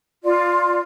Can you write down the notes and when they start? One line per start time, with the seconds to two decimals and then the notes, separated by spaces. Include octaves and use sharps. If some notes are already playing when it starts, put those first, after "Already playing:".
0.24 F4 D5